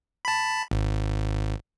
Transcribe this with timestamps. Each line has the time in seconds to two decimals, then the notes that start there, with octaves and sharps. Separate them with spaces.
0.25 A5 B5
0.71 G#1